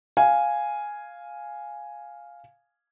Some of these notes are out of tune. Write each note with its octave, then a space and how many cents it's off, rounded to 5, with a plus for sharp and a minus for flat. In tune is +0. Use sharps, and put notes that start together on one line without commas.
F5 +0 G#5 +0